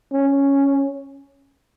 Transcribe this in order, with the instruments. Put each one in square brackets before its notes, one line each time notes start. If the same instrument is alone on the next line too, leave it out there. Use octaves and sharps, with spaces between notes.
[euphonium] C#4